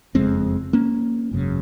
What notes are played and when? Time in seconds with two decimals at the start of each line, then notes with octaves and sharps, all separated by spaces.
0.14 F#1 F2 C#3 G#3 C4
0.73 A#3 C#4
1.31 G#1 F#2 C#3